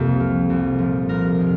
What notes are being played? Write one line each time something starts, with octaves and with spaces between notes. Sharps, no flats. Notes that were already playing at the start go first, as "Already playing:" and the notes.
Already playing: C2 F2 C3 A#3
F3
C2
A#2 F3
C2 A#4
C3 D#3